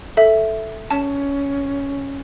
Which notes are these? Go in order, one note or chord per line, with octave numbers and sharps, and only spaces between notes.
A4 E5
C#4 A5